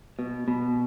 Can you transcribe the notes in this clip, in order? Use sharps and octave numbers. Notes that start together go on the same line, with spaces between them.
B2
B2